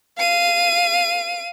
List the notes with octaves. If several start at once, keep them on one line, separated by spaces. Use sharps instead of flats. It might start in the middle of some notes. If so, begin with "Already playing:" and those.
F5 D#7